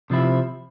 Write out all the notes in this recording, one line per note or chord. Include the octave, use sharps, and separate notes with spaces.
C3 F3 C4 E4